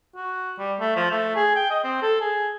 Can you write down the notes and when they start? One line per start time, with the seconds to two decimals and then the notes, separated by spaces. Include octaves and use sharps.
0.16 F#4
0.58 G3
0.80 A3
0.96 F3
1.11 A3
1.36 G#4
1.56 G5
1.70 D#5
1.84 C4
2.02 A4
2.21 G#4